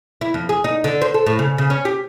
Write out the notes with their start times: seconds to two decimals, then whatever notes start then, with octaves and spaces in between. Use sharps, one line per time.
0.21 E4
0.34 F2
0.49 G#4
0.64 D#4
0.84 D3
1.02 C5
1.14 A4
1.27 A2
1.39 C#3
1.58 C#3
1.70 C#4
1.85 G4